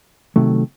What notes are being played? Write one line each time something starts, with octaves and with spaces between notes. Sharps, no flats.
C3 D#3 F#3 A3